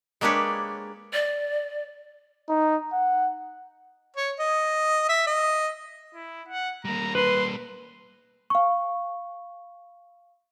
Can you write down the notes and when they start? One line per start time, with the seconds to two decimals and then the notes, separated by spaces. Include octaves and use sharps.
0.21 G#3 A#3 D4 G4 B4 C#5
1.13 D5
2.49 D#4
2.93 F#5
4.17 C#5
4.40 D#5
5.09 E5
5.27 D#5
6.14 E4
6.48 F#5
6.85 G3 A#3 A#5
7.15 B4 C6
8.50 F5 C#6